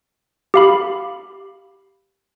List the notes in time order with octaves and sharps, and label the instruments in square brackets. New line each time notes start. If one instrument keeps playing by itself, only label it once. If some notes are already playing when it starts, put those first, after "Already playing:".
[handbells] G4 F5 B5